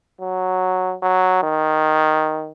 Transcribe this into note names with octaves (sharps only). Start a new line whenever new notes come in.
F#3
F#3
D#3